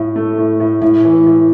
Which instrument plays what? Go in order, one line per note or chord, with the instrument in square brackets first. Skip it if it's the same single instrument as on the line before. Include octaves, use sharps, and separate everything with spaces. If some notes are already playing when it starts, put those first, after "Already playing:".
Already playing: [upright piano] A2 [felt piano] E4
[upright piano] A3
A2
A2
[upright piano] A2 [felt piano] E4
[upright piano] E3
A2